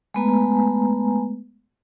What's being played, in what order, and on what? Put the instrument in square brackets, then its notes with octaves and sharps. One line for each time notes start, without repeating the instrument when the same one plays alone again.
[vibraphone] G#3 A3 B3 B4 G#5 A#5